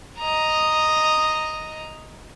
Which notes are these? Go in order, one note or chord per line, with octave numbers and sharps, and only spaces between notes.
D#5 A#5